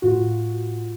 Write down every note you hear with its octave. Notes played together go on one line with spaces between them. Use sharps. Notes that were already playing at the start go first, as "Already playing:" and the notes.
A2 F4 F#4